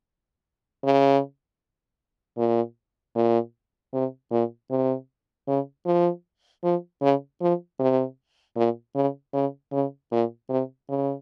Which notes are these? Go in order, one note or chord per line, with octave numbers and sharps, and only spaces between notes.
C#3
A#2
A#2
C3
A#2
C3
C#3
F3
F3
C#3
F3
C3
A#2
C#3
C#3
C#3
A#2
C3
C#3